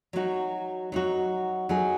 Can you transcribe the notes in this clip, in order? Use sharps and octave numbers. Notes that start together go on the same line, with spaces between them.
F#3 D#4 F#4
F#3 D#4 F#4
F#3 D#4 G#4